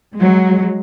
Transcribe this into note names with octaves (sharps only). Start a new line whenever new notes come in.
F#3 G#3